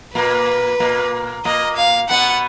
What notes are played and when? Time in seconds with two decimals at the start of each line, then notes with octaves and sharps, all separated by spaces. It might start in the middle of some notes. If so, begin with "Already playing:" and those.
0.15 A#2 A#3 B4
0.80 A#2 A#3
1.45 A#2 A#3 D#5
1.77 F5
2.09 B2 B3 F#5